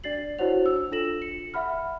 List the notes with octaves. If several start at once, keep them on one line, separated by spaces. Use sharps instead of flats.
D4 D5 A6 C7 F#7
E4 F#4 C5 C#5 F#5 F7
D4 E6
D4 F4 A4 A#6 E7 F#7
C#7
E5 F#5 B5 F6